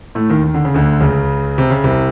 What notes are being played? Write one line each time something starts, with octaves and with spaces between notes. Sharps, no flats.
A2 A3
D#2 D#3
D#3
D3
C#3
D2 D3
C#2 C#3
C3
C#3
C2 C3